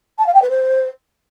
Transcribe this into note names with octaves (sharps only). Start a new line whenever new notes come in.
A5
F5
G5
B4
C5